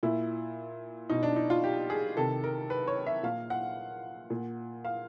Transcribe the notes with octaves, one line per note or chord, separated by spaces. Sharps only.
A#2 E4
B2 D#4
D4
D#4
F4
G4
G#4
C3 D#3 A4
A#4
B4
C#5
E5
A#2 F5
F#5
A#2
F5